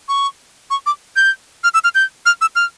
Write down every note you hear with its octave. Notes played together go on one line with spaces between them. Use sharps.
C#6
C#6
D6
G6
F6
E6
F6
G6
F6
E6
F6